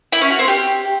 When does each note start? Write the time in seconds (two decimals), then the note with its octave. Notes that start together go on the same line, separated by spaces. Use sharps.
0.12 E4
0.21 C#4
0.30 F#4
0.39 C4
0.48 G4